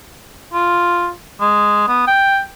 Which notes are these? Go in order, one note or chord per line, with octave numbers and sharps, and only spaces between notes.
F4
G#3
B3
G5